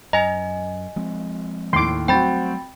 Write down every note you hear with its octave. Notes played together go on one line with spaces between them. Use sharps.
F#2 D#5 G#5 A#5
F3 G#3 C4
D#2 A2 C6 D6
F#3 G3 A3 C4 F#4 G5 B5 A6